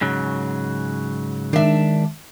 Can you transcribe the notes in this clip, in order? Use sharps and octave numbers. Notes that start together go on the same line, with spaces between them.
G#2 C#3 F#3
D#3 G#3 D4 E5